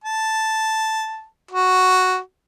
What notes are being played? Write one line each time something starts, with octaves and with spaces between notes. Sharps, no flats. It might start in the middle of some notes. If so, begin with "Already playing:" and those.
A5
F#4